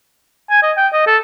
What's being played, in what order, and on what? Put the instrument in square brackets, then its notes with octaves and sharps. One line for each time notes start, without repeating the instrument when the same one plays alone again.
[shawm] G#5
D#5
G5
D#5
A4